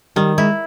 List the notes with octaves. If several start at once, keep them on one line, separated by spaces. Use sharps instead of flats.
D#3 G3
G#3 E4